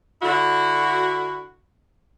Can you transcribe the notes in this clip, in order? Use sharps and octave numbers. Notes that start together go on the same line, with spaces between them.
D3 E4 F#4